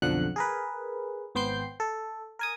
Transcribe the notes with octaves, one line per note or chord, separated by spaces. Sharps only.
B1 F2 D3 F3 F#5 F#6
G#4 A#4 B4
G#1 B3 C5 G5 G6 C7
A4
A#4 G#5 D#6